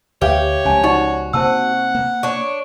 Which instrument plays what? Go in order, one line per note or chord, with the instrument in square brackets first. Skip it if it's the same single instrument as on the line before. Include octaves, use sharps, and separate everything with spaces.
[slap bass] D2 [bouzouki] G4 [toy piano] B4 E5 F5 [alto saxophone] C#5
[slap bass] C#2 F3 [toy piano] C#4 G#5 A5
[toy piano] D#4 D5 F#5 [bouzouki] F#4
[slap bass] C3 A#3 C4 [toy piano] C5 A5 E6 [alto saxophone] F#5
[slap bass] A#3
[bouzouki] D4 C#5